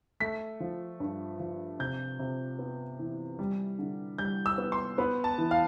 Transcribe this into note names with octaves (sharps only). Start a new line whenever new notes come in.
A3 B6
F3
G2
F3
C3 G6
C3
B3
E3
G3
D3
G3 G6
E6
B3
C6
B3 B5
A5
E3
F5